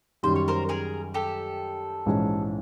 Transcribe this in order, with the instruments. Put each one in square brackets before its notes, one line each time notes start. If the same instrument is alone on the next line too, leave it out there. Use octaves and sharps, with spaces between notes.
[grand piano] F#2 D#3 G3 [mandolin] C5
[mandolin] C#5
A#4 C5
G#4 A#4
G4 A4
[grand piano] A#1 G#2 E3 G#3 C#4